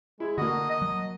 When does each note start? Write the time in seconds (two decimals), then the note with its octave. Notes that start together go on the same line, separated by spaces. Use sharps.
0.20 G#3 E4
0.38 D3 A#3 D4 F#4 D#5
0.71 D#5
0.82 F#3